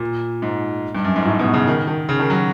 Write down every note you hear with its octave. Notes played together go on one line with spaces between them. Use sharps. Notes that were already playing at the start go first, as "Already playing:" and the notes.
Already playing: A#2
G#2
G2
F#2
G#2
A2
B2
C#3
D#3
D#3
C#3
D#3
F#3